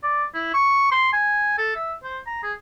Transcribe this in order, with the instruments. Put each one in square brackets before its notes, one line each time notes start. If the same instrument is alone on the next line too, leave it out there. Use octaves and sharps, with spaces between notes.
[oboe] D5
E4
C#6
C6
G#5
A4
E5
C5
A#5
G#4